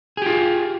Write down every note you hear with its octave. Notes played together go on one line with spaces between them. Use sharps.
F4 G4 G#4